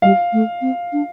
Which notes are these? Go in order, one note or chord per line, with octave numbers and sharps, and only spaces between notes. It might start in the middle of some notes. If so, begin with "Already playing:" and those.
G3 F5
A3
C4
D4